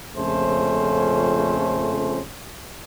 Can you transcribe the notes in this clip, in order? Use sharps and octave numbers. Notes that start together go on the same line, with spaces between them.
A#1 F2 C#3 A3 C#4 C5